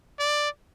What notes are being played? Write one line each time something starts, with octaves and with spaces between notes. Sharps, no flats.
D5